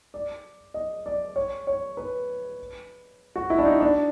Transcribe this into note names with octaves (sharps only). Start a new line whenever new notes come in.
D5
D#5
D5
C#5
C#5
B4
F#4
E4
D4
D#4
D4